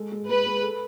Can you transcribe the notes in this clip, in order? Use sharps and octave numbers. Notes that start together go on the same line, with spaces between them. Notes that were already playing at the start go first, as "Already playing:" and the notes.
Already playing: G#3 A4
G#3
G#3 B4
G#3
A4